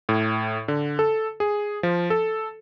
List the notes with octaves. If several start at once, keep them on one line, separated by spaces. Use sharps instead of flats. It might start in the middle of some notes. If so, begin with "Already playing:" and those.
A2
D3
A4
G#4
F3
A4